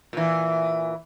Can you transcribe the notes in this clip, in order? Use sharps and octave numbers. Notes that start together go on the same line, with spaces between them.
A#2 E3